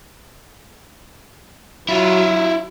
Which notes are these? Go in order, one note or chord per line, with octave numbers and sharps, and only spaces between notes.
F#3 E4 F4